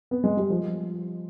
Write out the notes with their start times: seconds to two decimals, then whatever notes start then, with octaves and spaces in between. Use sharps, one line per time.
0.11 B3
0.24 G#3
0.37 G3
0.50 F3